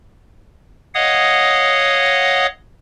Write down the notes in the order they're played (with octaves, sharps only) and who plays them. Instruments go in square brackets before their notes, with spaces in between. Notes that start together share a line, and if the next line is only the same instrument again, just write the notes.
[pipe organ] C#5 D#5 F5 F#5 D#6